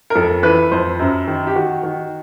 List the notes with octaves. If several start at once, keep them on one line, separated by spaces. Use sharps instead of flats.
A#4
F2 A4
E3 B4
F2 C5
F#2
D#3
G4
D#3 F#4
D#3